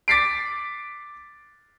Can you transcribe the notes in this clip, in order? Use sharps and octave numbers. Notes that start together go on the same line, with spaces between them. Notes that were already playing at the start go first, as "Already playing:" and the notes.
D6 A6 B6 C7 D7